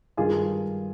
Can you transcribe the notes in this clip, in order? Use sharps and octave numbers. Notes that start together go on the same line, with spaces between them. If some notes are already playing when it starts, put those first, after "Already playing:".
G2 D#3 F4 G#4